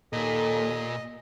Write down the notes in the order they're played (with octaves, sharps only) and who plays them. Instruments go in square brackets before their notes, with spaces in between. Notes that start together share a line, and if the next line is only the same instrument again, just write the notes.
[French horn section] D#2 A4 [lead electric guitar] A#2 [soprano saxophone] D#5